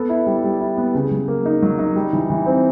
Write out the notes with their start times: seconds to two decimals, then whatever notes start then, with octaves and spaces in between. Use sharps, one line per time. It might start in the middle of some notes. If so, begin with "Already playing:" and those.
Already playing: B3 A4
0.09 E4
0.26 G3
0.44 G3
0.61 E4
0.78 B3
0.94 C#3
1.11 F#3
1.28 A#3
1.46 D#4
1.62 F#3
1.79 D#4
1.96 G3
2.13 E3
2.30 E3
2.46 C4